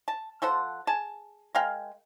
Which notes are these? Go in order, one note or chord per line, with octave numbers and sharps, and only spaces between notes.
A5
F3 A4 C5 F#5
G#4 A5
G#3 A#4 F5 G5